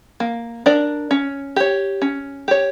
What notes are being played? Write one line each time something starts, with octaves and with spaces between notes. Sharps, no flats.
A#3
D4 A#4 D5
C#4
G4 C#5
C#4
G4 C#5